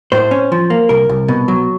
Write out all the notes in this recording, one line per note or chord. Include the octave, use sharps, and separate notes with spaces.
A2 C5
C#4
F3
A#3
C2 A#4
C2
B2
F#3